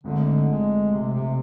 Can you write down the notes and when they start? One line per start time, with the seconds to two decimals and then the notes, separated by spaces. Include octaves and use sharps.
0.03 G#1 G#2 D3 F3 A3
0.48 G#3
0.91 C3
1.13 C3